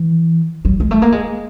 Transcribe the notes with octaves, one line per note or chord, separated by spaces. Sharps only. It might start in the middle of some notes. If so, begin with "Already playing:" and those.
Already playing: E3
F#3
G#3
A3
A#3
G#3